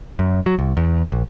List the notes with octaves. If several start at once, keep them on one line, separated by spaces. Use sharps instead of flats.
F#2
F#3
C2
E2
A#1